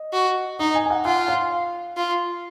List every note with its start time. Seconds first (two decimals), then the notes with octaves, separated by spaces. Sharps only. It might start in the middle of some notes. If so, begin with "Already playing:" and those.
Already playing: D#5
0.13 F#4
0.59 D#4 D#5
0.75 G#5
0.85 G#5
0.90 F#5
1.05 F4 F#5
1.28 F5
1.97 F4